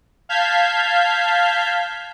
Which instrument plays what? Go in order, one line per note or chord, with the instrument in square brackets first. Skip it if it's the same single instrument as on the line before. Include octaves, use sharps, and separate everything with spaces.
[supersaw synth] F5 A5 F6 G6 G#6 B6